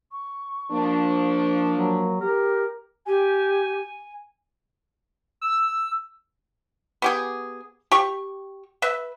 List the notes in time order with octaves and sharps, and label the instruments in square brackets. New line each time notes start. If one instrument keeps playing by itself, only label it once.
[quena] C#6
[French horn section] F3 D4 [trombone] A#3
[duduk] F#3
[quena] G4 [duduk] A#4
[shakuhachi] G4 [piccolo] G#5
[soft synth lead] E6
[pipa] B3 G4 G#4
G4 C#6
B4 E5